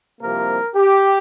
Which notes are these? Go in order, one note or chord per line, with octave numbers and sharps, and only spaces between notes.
C2 C3 F3 A#3 A#4
G4